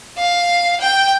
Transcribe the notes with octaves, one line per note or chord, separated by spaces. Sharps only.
F5
G5